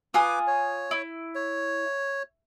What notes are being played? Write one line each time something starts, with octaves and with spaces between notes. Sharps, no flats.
F4 B4 G#5 D6 D#6
C#5
E4
C#5